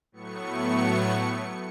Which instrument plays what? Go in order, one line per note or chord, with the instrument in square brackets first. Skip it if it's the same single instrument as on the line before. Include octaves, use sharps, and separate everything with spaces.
[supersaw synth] A2 F#3 A3 B3 C#6 C#7